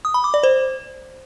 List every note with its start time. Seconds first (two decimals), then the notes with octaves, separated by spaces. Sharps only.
0.05 D#6
0.14 B5
0.24 D6
0.34 D5
0.43 C5